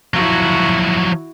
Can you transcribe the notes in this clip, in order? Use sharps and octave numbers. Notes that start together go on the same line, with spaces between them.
F3 F#3 E4 F#4